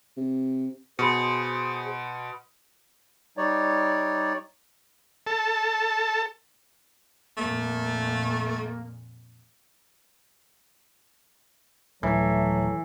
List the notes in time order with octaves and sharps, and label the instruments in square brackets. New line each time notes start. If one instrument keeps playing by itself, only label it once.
[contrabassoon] C3
[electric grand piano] B2 [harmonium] G#4 C5 [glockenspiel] B5 C6 C#7
[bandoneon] G3 D#4 C#5 D5
[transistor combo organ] A4
[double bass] F2 A#2 [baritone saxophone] A3 [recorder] A#3
[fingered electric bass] D#1 [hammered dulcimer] E3 [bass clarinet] F#3 [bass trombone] A3